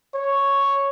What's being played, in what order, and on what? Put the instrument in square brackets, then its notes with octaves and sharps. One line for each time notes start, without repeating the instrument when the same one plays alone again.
[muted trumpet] C#5